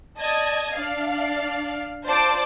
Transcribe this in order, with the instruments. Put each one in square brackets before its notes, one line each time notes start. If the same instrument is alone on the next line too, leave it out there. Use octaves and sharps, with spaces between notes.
[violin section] D5 D#5 A5 D#6 G#6
D4 D5 F5
F4 C5 D5 A5 D6